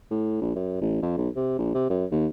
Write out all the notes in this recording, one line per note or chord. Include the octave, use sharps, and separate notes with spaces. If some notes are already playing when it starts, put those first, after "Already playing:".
A2
A#1
F#2
A1
F2
B1
C3
A#1
C3
F#2
D#2